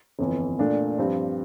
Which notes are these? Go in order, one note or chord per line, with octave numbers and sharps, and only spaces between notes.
G1 F2 E3
A#2 A3 D4
G2 F3 C4 G4